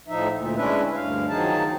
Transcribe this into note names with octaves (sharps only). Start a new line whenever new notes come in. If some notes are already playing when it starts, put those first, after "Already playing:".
A2 F3 D#4 E5
D2 A#2
G#3 C#4 D4 E4 B4 E5
D2 G2 F5
D#3 F3 F#3 D#4 G#4 A5